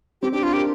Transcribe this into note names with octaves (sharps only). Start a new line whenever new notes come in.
C4 G4
D4 G4
D4 F4
G4 A#4